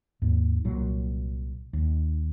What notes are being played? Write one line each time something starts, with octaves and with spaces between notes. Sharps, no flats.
D#2 G#2
C2 A#2 F#3
D#2